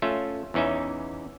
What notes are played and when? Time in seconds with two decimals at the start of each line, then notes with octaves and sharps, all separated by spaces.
0.02 A3 C#4 F4 E5
0.54 E2 E3 C#4 D#4 E5